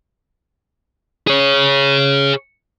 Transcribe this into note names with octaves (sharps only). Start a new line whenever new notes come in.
G#4 C#5